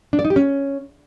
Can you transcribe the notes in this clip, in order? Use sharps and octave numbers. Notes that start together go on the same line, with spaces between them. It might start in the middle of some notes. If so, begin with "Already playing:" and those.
D4
D5
D#4
G4
C#4